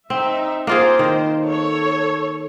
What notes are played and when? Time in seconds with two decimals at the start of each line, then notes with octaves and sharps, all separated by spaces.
0.10 C4 D#4 E5
0.67 A#3 F4 G#4 C5
0.99 D#3
1.44 A4 C#5